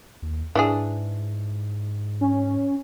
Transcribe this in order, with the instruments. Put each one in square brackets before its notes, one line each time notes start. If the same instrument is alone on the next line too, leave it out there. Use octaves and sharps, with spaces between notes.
[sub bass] D#2
[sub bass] G#2 [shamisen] E3 D4 G#4
[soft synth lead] C#4